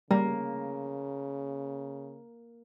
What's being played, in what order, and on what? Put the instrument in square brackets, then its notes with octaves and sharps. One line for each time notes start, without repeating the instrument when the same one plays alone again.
[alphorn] C#3 [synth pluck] G3 [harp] A#3